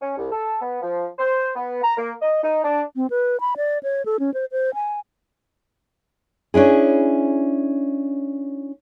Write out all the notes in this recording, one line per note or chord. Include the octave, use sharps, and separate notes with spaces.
C#4
C2
A4
B3
F3
C5
B3
A#5
A#3
D#5
D#4
D4
C4
B4
B5
D5
C#5
A4
C#4
C5
C5
G#5
C#4 D4 E4 G#4